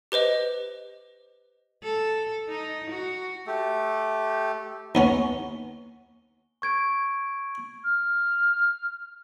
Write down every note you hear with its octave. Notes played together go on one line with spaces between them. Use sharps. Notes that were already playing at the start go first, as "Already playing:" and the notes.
G4 B4 C5 D#5
A4
D#4
F#4
A3 G4 A4
D#2 B3 C#4 G7
C#6 G#6 D7
F6